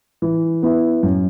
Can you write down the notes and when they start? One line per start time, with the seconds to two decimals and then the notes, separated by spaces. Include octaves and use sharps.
0.22 E3
0.62 B3 E4
1.03 F#2